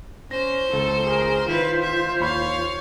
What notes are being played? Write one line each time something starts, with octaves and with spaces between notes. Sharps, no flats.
C#4 C5 A#6
C#2 A4
G#4 A#4
D#3 E4 F4 B4 C5
E5
D#2 C#5 F5 B5 C6